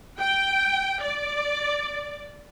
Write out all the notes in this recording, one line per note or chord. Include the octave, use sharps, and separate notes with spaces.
G5
D5